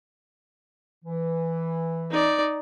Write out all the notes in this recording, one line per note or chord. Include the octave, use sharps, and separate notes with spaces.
E3
D#4 D5